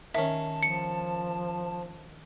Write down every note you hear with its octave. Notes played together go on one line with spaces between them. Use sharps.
D#3 C#4 E5 A5
F3 C#7